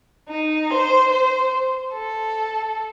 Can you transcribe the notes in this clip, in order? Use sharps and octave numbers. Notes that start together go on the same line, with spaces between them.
D#4
C5
C5
A4